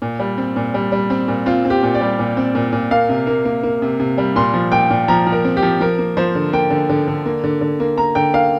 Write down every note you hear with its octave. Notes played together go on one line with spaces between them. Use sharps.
A#2
G3
C4
A#2
G3
G3
C4
A#2
C4 F4
C4
G4
A#2
D5
G3
A#2
C4
A#2
A#2
A#3 F5
C3
A#3
A#3
A#3
C3
C3
G3
A#2 C6
F3
A#2 G5
A#2
F3 A#5
F3
A#4
C4
G4
F3
F3 A#4
A#3
F3 C5
D3
A#3 G5
D3
D3
D3
A#3
D3
D3
A#3
A#3 A#5
D3 G5
A#3 F5